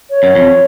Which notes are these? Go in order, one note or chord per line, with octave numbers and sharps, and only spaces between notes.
C#5
F#2
F2